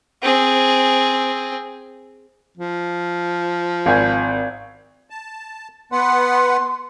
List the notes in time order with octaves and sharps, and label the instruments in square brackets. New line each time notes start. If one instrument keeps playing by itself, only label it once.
[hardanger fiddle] C4 G#4
[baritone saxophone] F3
[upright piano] G#1 G#5 G#6 [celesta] F5 G6
[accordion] A5
[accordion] B3 B4 F#5 [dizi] C6